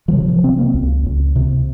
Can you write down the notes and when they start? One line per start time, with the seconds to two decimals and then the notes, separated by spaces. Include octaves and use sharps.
0.08 F3
0.13 C3 F#3
0.28 F3
0.44 C3 C4
0.59 A#3
0.74 C#2
1.06 C#2
1.36 C3